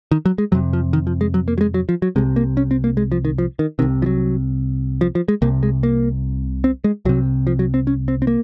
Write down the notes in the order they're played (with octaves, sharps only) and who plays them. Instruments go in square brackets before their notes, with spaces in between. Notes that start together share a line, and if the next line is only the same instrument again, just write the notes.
[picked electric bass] D#3
F#3
G#3
F2 C3 F#3
F3
D#3
F3
G#3
F#3
A#3
F#3
G#3
F#3
F3
F#3
C2 C3 G#3
A#3
C#4
C4
A#3
G#3
F3
D#3
F3
D#3
C3 D#3
C2
F3
F#3
F3
F3
G#3
C2 C3 A#3
G#3
A#3
C4
G#3
C2 C3 F#3
F3
F#3
C4
C#4
C4
C4
A#3